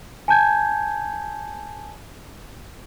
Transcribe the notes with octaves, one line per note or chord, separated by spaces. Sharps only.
G#5 A5 G6 G#6